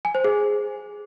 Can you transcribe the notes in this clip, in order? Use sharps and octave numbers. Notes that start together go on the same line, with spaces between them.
G#5
C5
G#4